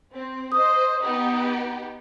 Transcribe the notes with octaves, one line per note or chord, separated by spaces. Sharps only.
C4
C5 D#5 D#6
B3 D#4 G4